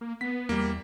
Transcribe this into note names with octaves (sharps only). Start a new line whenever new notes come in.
A#3
B3 B6
E2 G3 A#3